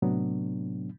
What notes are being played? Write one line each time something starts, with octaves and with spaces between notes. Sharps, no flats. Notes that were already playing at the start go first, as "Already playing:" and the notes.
A2 C3 F#3 A3 B3 D4